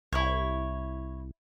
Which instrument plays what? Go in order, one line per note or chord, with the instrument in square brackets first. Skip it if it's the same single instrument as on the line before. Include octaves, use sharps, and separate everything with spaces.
[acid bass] C2 [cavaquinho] E4 C#5